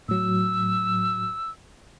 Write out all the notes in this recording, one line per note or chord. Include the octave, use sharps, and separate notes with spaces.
A2 F#3 E6